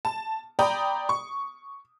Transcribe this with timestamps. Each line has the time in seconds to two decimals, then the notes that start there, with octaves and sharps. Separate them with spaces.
0.05 A5
0.59 D5 G5 A#5 B5 D#6
1.09 C#6